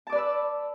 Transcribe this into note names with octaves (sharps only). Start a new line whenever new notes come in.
B4 D5 A5 D6 E6